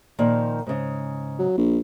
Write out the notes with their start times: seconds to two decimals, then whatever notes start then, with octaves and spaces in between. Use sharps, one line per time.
0.18 A#2 D#3 F3
0.66 G#2 C#3
1.39 F#3
1.57 A#1